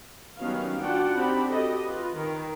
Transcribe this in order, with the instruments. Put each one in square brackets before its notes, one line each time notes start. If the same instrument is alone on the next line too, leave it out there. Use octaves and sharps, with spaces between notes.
[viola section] D#3 F#3 G3 B3 C#4 F5
D4 F4 F#4 F#5 G5
C4 D4 D#4 G4 B5
F#4 G4 A4 D#5
F4 B4
D#3